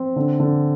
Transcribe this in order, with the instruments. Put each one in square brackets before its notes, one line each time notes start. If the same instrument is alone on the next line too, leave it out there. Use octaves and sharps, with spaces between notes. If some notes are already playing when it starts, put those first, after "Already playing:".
Already playing: [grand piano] C4
D3
D3